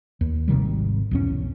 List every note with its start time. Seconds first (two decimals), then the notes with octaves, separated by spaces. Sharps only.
0.21 D#2
0.48 G#1 C3 D#3 G3
1.11 B1 E2 C#4